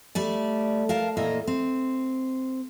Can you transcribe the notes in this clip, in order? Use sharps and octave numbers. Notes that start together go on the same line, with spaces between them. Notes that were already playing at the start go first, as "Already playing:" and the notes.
G3 A3 D5
A#4 F5 A5
A#2 E3 A#3 A4 D#5
C4